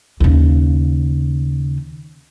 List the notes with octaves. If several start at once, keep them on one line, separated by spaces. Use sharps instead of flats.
D#2 C#3